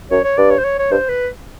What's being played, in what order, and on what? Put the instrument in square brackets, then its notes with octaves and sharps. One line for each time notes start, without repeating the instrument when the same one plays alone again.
[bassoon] F#2 [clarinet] C#5
[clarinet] C#5
[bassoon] G2 [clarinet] D5
[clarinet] C#5
C5
C#5
C#5
[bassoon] G2 [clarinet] C5
[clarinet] B4